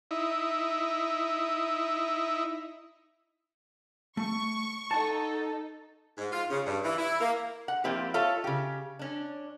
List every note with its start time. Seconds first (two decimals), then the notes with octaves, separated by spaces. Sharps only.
0.11 D#4 E4
4.17 A3 C#6
4.91 D#4 A4 F#5 A5
6.18 G#2
6.32 F4
6.50 C#3
6.66 G2
6.84 E3
6.98 E4
7.20 A#3
7.68 F#5
7.84 F3 A#3 C4 E4 G4
8.14 F4 A4 C#5 E5 F5
8.44 C#3 G4
8.99 C#4 D4